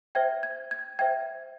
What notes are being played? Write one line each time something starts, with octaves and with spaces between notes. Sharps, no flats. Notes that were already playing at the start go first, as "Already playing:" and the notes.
C5 E5 G5 G#6
G#6
G#6
C5 E5 G5 G#6